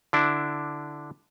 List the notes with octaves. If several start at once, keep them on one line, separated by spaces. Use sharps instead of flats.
D3 D4 E4